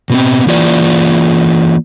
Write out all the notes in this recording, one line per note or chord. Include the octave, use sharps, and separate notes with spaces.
B2 B3 C4
E3 A#3 F4 D5